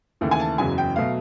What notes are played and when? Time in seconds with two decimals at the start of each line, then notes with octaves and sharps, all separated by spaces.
0.21 D#2 C#3 E3 A3
0.31 G#5
0.40 A5
0.58 F#1 E2 C#3 F#3 G#5
0.78 G5
0.96 B2 F#3 A3 F5